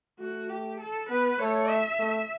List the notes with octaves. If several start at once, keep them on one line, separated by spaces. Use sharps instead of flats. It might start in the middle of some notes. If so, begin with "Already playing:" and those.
A3 F#4
G4
A4
B3 B4
A3 C#5
E5
A3